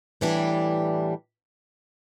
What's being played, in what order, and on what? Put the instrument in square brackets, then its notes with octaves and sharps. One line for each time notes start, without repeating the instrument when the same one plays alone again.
[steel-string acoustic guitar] A2 E3 G3 D4 G4